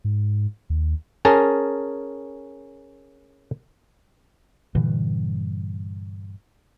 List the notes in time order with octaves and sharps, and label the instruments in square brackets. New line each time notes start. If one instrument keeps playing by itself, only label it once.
[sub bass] G#2
D#2
[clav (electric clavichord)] C#4 G#4 A#4 A5
[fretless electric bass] G2 A#2 D3 E3